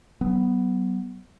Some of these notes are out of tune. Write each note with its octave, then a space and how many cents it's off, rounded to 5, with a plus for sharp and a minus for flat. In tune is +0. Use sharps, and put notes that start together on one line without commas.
F#3 +30 B3 +0